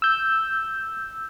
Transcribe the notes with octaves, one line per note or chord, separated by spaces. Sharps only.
E6 G6